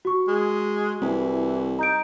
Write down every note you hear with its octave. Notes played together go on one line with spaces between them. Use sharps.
F#4 C#6
G#3
C2 E3
D#4 A#5 G6 D7